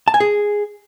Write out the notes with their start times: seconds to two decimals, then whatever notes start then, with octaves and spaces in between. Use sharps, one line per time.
0.08 A5
0.14 G#5
0.20 G#4